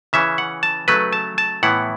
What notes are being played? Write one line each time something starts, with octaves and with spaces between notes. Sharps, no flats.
C#3 E3 C#4 E5
F#5
A5
C#3 F#3 A3 B4
A5
A5
A2 E3 B3 E4 F#5